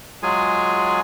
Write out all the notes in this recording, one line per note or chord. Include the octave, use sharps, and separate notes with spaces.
F#3 G#3 F4 G#4 G#5